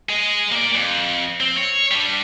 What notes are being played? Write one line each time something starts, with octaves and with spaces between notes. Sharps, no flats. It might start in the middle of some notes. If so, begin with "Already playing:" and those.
G#4 D#5
A#3 D5
F2
C4
C#5
G3 D4